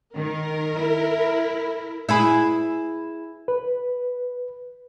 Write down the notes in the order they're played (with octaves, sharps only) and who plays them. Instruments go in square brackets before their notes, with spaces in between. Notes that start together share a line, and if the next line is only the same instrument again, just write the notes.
[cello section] D#3 [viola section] A#4
[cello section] E4
[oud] E4 G#4 B4
[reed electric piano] B4